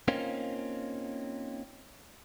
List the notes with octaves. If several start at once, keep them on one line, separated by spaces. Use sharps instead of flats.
A#3 C4 C#4 D#4 F4